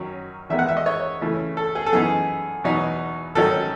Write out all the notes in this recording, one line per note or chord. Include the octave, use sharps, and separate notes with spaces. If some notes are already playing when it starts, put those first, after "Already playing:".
Already playing: F#2 D#3 F#3 C#4
E2 D#3 G#3 B3 E5
F#5
E5
D#5
C#5
C#3 E3 A3 C#4
A4
G#4
A4
F#2 E3 B3 D#4 G#4
E2 B2 F#3 B3 D#4
G#2 D#3 F#3 C#4 A4